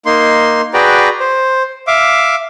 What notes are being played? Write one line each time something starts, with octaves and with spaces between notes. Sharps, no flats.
A#3 D#4 C6
F#4 G#4 B4 D5 G5 A#5
C5
E5 F5 D6